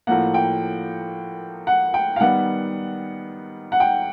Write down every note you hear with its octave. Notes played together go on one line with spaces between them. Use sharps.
A2 F3 A#3 F#5
G5
F#5
G5
F5
D#3 G3 B3 F#5
F#5
G5